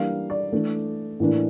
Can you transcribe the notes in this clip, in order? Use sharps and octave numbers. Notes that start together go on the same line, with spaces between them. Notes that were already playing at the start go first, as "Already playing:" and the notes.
Already playing: E3 G3 A#3 D4 F5
D5
E3 A3 D4
A2 E3 A#3 D4